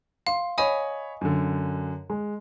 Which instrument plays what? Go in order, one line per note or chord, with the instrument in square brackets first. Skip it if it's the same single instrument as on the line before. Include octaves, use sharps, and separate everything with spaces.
[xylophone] F5 [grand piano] C6
[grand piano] C#5 B5 [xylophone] D#5 G#5 D#6
[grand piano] F#2 D3
G#3